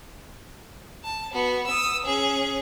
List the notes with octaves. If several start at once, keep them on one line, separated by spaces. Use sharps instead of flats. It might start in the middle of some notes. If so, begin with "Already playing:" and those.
A5
B3 F#4
D#6 E6
C#4 G#4